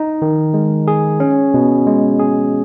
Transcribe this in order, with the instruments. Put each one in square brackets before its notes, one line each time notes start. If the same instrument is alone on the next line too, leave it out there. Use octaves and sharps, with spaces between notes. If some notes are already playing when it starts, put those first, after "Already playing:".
Already playing: [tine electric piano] D#4
D#3
G#3
G#4
C#4
B2
G#3
G#4